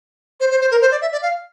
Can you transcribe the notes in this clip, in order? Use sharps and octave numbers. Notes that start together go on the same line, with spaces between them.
C5
C5
C5
A#4
C5
D5
E5
D5
F5